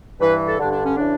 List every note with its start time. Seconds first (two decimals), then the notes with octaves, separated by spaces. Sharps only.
0.20 G2 E3 B4
0.46 A4
0.59 D3 D4
0.64 G2
0.71 D4
0.85 C#4
0.97 C#3 E3 D4